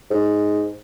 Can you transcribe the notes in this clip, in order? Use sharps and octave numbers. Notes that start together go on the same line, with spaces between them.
G#2